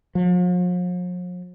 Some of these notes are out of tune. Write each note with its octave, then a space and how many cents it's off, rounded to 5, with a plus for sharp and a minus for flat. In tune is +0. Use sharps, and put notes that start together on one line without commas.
F3 +45